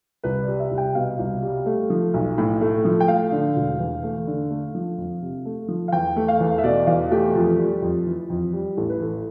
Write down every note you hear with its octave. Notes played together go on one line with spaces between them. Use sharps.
C2 B4
D5
G3
E5
C2
G5
B2 F5
C2
G3
A3
F3
B1
A2
A3
F3
G5
A3 F5
D3
E1
E2
A3
D3
A3
F3
F2
C3
A3
F3
F5
E2 G5
A3
F5
E2
E5
B2 D5
E2 F5
A3 G4
F2 F4
G3
F2
E3
F2
G3
A1 A4
B4
E3 A4